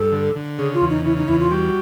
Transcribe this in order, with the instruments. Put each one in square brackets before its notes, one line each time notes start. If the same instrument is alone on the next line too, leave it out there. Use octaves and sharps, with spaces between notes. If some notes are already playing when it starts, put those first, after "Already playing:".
Already playing: [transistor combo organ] G2 [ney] A4
[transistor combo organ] D3
D3
[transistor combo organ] C#3 [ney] G#4
[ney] F4
[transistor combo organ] E2
[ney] D#4
[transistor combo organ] C#3 [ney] E4
[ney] D#4
[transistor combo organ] E2 [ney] E4
[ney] F4
[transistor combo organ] G3 [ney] F#4